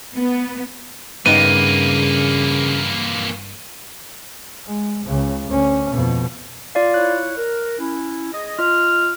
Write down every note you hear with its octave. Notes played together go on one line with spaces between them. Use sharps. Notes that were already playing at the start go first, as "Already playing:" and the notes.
B3
G2 C#3 E3 A#3 B3 D#4 D#7
G#3
C#2 C#3
D2 C#4
F2 B2
F4 D5 F5
E4 C#5 F#6
A#4
C#4 E4
G#4 D#5
F4 D#5 F6